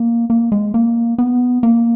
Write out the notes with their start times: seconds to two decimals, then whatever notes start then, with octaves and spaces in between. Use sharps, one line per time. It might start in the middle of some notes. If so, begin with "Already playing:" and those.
Already playing: A#3
0.30 A#3
0.52 G#3
0.74 A#3
1.18 B3
1.63 A#3